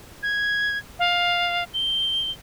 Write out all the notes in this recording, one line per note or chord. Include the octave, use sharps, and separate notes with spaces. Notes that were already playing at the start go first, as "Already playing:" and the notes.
G#6
F5
G7